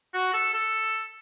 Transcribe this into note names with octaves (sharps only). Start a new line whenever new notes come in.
F#4
A4
A4